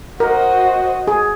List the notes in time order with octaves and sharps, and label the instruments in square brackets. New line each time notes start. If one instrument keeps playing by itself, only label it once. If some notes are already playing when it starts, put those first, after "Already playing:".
[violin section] F#4 C5 D#5 [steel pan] A#4
[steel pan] G#4